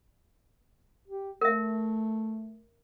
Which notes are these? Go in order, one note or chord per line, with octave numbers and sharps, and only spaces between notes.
G4
A3 A#4 E5